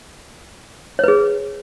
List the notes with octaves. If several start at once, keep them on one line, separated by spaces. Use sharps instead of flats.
G#4 B4 C#5